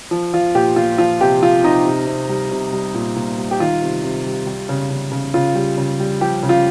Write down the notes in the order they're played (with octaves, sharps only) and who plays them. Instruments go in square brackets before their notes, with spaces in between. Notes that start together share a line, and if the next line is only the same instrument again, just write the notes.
[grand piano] F3
F3 F4
A#2 G4
A#2 F4
F3 F4
C3 G4
F3 F4
C3 D#4
C3
C3
G3
C3
G3
A#2
A#2
G3
G4
D#3 F4
C3
C3
G3
G3
C#3
C#3
C#3
C#3 F4
G3
C#3
G3
F3 G4
C#3
F4